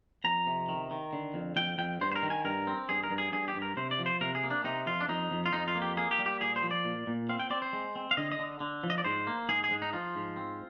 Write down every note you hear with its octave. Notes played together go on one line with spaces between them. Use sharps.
F2 A#5
C3
D#3
D#3
D3
F2
F2 G5
F2 G5
G2 C5
C5
A#4
D#3
G#5
G2 A#4
C4
G2 G#4
A#4
G2
G#4
G2 G#4
G4
G2
A#4
C3 C5
D5
F3
C5
C3 A#4
G#4
A#3
D4
C3 D#4
F2 F4
D4
F2 D#4
F2
F4
F2 D#4
F4
A#3
G4
A#3 G#4
G4
G3
G4
A#2 G#4
C5
F3
D5
A#2
A#2
C4 F5
G5
C4 D5
C5
G#3
C4
F5
D3 D#5
D#5
D3
D3
F3
D#5
D5
G#2 C5
A#3
G#2 G#4
G#4
G#2
D#4
F3 F4
G#2
C4